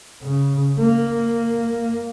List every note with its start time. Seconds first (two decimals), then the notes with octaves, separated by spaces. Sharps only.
0.22 C#3
0.79 A#3